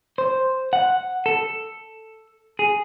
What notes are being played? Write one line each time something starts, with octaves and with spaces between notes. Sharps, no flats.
C5
F#5
A4
G#4